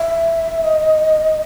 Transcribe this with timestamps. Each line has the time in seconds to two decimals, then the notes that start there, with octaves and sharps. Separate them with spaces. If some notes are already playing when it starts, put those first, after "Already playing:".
Already playing: E5
0.64 D#5